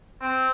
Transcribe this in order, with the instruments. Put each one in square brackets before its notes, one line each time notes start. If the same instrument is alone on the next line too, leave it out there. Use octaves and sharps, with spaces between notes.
[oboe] C4